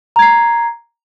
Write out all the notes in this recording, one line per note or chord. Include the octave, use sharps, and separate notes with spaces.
A#5 G#6 C7